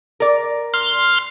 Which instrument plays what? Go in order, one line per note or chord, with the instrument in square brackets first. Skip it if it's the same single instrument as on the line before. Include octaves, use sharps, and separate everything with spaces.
[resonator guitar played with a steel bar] A#4 D5
[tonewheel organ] C6 F6